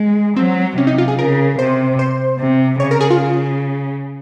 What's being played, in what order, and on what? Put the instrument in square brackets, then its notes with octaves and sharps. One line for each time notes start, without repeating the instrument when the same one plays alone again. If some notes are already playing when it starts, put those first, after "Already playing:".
Already playing: [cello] G#3
[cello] F#3 [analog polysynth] C4
[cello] C3 [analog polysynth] C#4
[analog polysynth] D#4
F4
G#4
[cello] C#3 [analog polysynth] A#4
[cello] C3 [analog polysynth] C5
[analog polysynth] C5
[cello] C3
[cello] C#3 [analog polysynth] C#5
[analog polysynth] A#4
G#4
F4